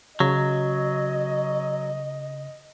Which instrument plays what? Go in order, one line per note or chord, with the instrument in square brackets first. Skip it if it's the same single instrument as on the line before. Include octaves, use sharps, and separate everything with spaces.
[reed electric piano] C#3 [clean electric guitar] F#3 [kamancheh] D#5